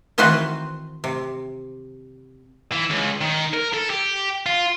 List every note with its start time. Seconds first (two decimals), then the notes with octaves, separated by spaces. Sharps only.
0.18 D#3 E3 C4 F#4 B4 C5
1.04 C3
2.72 E3
2.90 C#2
3.21 D#3
3.53 A#4
3.74 A4
3.90 G4
4.46 F4